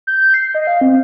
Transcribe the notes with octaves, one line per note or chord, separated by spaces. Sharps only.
G6
C7
D#5
F5
C4